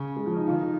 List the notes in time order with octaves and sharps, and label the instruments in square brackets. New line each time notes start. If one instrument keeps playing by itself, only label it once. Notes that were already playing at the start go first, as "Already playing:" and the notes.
Already playing: [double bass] C#3
[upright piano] G#3
F3
D#4
[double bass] D#3 [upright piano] F4
[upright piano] D#4